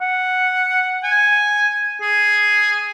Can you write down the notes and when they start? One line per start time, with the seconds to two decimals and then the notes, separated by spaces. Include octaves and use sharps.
0.01 F#5
1.03 G#5
2.01 G#4